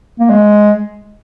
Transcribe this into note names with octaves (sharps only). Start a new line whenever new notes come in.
A#3
G#3